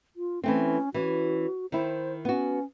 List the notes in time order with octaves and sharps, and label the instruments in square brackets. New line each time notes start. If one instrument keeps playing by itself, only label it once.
[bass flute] F4
[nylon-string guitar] E3 A3 C4 [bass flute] C#4
[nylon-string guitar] E3 C#4 [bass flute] F#4
[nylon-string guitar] D#3 E4 [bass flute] C5
[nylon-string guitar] B3 F#4 [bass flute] C#4